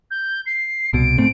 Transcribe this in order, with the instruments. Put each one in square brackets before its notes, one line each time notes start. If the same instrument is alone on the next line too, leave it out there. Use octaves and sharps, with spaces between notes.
[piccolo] G6
C7
[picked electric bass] C2 B2 [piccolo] D7
[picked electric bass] G#2 A3 C4